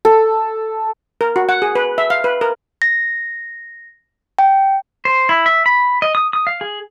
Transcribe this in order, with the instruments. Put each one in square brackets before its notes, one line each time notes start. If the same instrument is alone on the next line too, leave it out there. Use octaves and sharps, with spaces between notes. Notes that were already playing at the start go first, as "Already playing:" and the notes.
[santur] A4
[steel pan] A#4
F#4
F#5
G#4
B4
E5
F5
B4
A#4
[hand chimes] A#6
G5
[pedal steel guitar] C5
E4
E5
B5
D#5
D#6
D#6
F5
G#4